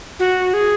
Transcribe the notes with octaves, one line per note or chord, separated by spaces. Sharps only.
F#4
G#4